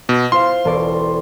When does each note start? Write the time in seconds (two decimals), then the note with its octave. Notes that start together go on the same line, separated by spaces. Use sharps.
0.09 B2
0.32 F4 C5 F5 C6
0.65 E1 A4 D5